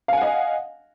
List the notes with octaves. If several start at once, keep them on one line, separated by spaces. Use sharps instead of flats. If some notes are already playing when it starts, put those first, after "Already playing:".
D#5 F5 F#5 G#5